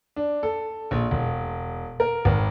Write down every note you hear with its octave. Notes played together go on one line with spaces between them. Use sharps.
D4
A4
A#1
E1
A#4
G#1